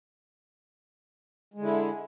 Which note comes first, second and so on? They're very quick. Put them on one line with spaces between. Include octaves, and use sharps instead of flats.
G#3 D3 E4